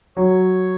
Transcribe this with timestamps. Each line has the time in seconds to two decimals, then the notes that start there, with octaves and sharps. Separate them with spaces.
0.17 F#3 C#5